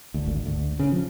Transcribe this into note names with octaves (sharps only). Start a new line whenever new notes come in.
D2
G#1
D2
C#3
F3